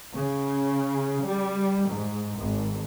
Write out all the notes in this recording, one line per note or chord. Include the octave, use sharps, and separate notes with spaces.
C#3
G3
G#2
G#1